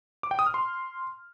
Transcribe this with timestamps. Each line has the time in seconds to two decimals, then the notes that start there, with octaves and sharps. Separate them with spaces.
0.23 D6
0.31 G5
0.39 D#6
0.46 F6
0.54 C6